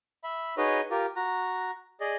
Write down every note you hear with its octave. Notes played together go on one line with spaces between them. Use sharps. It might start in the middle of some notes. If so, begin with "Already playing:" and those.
E5 B5
D#4 F#4 G#4 B4 C#5 D#5
F4 G4 A#4
F#4 A#5
G#4 D5 D#5